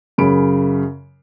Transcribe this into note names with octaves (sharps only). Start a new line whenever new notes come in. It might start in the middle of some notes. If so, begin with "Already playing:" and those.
F#2 C#3 A#4 B5 D7